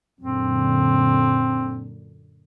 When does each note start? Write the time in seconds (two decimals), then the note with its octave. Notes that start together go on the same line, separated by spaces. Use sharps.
0.21 F#2 A#2 D3 C4